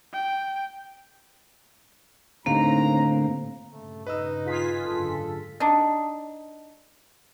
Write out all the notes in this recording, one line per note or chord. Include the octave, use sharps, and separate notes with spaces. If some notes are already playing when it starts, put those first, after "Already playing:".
G5
D#2 A2 D3 A#3 C4 F5 A#5
G2 A#2 C#3 A3
D#4 B4 D#5 E6
F4 G#4 B6
F#1 G#2 D3 A4
D4 D#4